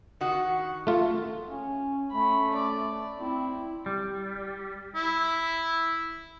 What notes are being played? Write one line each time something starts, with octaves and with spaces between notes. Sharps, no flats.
D#3 F#4
A3 F4
C#4
A3 C#4 B5
D5
C4 E4
G3
E4